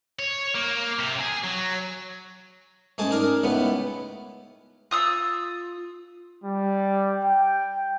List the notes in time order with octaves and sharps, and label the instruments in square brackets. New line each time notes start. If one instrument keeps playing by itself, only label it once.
[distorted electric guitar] C#5
A#3
C3
G#4
F#3
[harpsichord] G#2 G#4 A5 [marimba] A3 C#4
[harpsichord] D4 G#4 A#4 [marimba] D#4
[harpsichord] C#2 A2 B3
[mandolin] F4 D#6 E6
[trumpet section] G3
G5